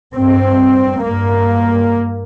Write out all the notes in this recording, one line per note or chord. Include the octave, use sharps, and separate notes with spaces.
G2 C4
G2 A#3